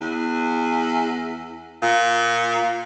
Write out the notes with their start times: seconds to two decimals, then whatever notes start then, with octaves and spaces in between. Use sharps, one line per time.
0.01 E2
1.82 A#2